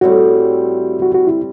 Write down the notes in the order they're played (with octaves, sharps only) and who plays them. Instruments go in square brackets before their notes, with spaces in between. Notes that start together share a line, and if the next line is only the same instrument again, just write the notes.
[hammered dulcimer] A2 G3 C4 [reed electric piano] F#4
[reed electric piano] F#4
F#4
E4